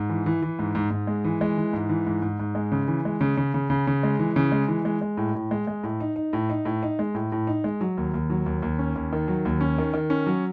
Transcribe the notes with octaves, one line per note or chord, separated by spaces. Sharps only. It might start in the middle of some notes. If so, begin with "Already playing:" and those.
Already playing: G#2
E3
E3
E3
G#2
G#2
G#2
G#3
E3
G#3
E3
G#2
E3
G#2
G#2
G#2
G#3
C#3
E3
G#3
C#3
C#3
C#3
C#3
C#3
G#3
E3
C#3
G#3
E3
G#3
G#3
A2
A2
G#3
G#3
A2
D#4
D#4
A2
D#4
A2
D#4
G#3
A2
A2
D#4
G#3
F#3
D#2
D#2
F#3
D#2
D#2
C#4
D#2
D#3
F#3
D#2
C#4
D#3
D#3
C#4
F#3